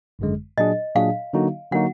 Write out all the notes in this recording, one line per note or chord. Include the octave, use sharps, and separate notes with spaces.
G#1 F#2 D3 G#3
A#2 F#3 D4 G#4 D#5
A#2 F#3 D4 G#4 F5
D3 F#3 A#3 D#4 F#4
D3 F#3 A#3 D#4 F#4 F#5